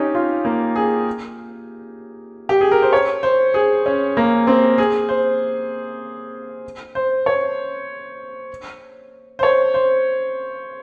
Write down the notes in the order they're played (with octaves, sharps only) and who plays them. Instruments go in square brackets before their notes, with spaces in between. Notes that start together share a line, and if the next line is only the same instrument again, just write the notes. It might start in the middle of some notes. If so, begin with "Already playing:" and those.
Already playing: [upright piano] C#4 D#4 G4
F4
A#3
G#4
G4
G#4
A#4
C5
C#5
C5
G#4
C#4
A#3
C4
G#4
C5
C5
C#5
C5
C#5
C5